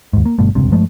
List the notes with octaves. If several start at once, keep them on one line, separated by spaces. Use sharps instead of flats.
D#2 G#2
A#3
G1 G2 B2 A3
D#1 C#2 G2 C3
G2 F3 G#3 A3